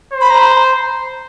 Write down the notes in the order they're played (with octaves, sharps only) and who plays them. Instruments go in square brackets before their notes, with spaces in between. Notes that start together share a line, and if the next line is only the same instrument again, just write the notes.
[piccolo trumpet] C5
[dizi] B5
A#5
B5
A#5